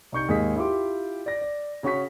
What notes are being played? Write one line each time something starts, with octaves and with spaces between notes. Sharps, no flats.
C2 D#4 C#6 G6 C#7
D#2 G#2 G#4 D#5 B6
E4 F4 G4 C6 D6
D5 A#6
D5
C#3 C#4 F#4 C#6 B6